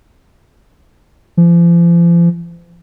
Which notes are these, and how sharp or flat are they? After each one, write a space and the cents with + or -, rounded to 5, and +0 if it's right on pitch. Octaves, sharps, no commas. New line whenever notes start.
F3 -40